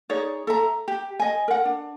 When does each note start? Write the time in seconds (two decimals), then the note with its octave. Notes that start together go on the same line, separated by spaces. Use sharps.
0.09 D#4 G#4 C#5 D5
0.47 A4 E5 A#5
0.88 G4
1.20 D#5 G#5
1.48 A#4 F#5
1.65 D4